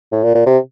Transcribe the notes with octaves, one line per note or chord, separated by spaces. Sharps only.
A2
A#2
A#2
C3